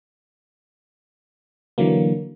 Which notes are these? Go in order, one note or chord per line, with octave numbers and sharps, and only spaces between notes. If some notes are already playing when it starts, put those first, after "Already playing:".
D3 E3 F#3 A#3